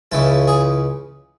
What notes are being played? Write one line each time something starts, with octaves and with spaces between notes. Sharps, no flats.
C#2 C#3 E3 A4
G#4